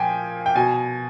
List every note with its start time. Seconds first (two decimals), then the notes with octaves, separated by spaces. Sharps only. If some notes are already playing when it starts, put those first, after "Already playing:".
Already playing: A#2 F3 G5 G#5
0.46 G5
0.55 B2 G#5